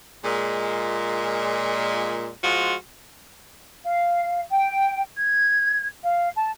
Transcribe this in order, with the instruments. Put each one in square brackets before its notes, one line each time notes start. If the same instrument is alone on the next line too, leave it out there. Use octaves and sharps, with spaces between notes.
[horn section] A#2 G#3
F3 G#3 F4 F#4
[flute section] F5
G5
G#6
F5
A5